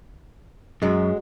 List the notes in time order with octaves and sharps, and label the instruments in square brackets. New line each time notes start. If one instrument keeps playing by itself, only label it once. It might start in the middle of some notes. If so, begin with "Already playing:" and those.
[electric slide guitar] F#2 [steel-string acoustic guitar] F#3 G#3